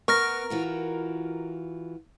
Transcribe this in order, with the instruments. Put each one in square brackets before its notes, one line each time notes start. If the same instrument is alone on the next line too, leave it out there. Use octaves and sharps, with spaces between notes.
[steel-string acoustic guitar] B3 [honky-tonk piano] A#4 [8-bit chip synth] C#6 F6 A#6
[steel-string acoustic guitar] E3 F4 F#4